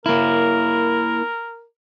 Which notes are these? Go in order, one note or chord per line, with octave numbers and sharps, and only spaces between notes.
A#3 E4 A#4